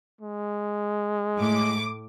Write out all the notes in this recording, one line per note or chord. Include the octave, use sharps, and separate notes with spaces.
G#3
A2 D6